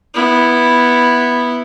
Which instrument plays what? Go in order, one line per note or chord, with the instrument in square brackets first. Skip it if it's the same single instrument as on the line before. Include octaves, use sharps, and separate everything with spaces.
[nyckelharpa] B3 E4